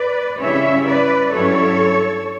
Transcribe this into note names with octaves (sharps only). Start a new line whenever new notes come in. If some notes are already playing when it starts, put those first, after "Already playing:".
Already playing: B4 D5
C#3 G3 C#4 E4 C#5 E5
B4 D5
G2 F#3 C#4 E4 A4 C#5